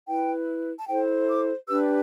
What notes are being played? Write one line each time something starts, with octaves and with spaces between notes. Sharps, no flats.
E4 B4 G5
A5
E4 A4 C5 G5
D6
D4 G4 B4 E6